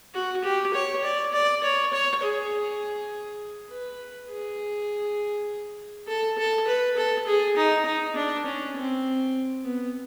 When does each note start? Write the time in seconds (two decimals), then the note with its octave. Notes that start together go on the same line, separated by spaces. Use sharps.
0.14 F#4
0.44 G4
0.74 C#5
1.04 D5
1.33 D5
1.64 C#5
1.93 C#5
2.23 G#4
3.70 B4
4.30 G#4
6.08 A4
6.38 A4
6.68 B4
6.97 A4
7.27 G#4
7.57 D#4
7.86 D#4
8.16 D4
8.46 C#4
8.76 C4
9.65 B3